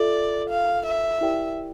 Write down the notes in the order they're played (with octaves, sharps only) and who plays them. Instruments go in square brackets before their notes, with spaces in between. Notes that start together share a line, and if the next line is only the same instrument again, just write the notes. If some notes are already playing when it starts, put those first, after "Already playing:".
Already playing: [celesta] F4 A4 E5 [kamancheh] D5
[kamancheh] F5
E5
[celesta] E4 G4 A#4 D5 G5